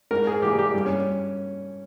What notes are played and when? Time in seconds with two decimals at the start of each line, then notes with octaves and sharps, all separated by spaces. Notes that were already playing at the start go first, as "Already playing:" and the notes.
0.11 G#2 A#4
0.27 G#4
0.42 E3 A#3 G4
0.59 G4
0.75 G2
0.85 C#4